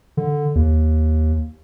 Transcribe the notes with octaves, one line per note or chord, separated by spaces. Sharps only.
D3
D#2